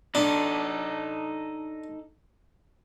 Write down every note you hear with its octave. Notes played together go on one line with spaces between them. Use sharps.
D4 D#4 A4